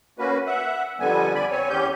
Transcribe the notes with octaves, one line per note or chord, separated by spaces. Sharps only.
A#3 C#4 F#4 B4
E5 F#5
F2 D3 G3 B3 G#5
D5 G#5 B5
C4 C#5 G#5
E2 C#4 G4 G6